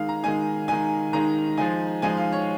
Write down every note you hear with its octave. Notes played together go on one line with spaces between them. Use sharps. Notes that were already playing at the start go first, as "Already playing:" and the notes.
Already playing: D#3 G#3 D#4 F5
A#5
D#3 G#3 D#4 G#5
D#3 G#3 D#4 G#5
D#3 G#3 D#4 A#5
F3 G#3 D#4 G#5
F3 G#3 D#4 G#5
F5
C#5